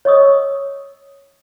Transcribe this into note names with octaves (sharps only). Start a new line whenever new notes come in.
C#5 D#5 C#6 D#6 E6